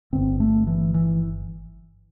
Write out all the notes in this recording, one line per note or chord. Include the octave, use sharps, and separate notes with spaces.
G1 G2 D3 C4
A3
E3
E3